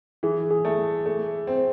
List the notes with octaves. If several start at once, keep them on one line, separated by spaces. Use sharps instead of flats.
E3 G#4
G#4
A3
A3
C4